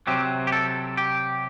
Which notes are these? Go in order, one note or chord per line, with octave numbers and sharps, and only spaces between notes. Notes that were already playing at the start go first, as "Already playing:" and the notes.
C3 F#3 C4 G4
G4
A4
G4